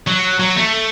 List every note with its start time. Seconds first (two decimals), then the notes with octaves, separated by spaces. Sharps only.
0.07 F#3
0.40 F#3
0.57 A3